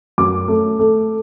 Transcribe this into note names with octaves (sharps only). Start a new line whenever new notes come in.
F#2 D6
A3
A3